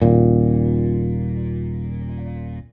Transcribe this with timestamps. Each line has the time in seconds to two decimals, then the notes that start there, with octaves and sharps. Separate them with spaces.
0.02 D#1 A#2